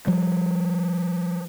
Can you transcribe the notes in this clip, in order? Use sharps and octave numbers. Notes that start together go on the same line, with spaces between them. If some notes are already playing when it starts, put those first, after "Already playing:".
F3 G3